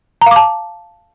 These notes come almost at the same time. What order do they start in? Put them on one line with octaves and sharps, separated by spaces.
A#5 F5 D6 A5